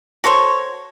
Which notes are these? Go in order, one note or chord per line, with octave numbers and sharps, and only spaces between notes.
F#4 A4 C5 C#5